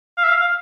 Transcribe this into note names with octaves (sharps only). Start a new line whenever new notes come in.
F5
E5
F5
F5